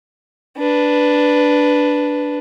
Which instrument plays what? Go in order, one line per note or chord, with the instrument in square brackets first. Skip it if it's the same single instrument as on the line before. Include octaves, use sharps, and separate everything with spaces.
[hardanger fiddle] D4 B4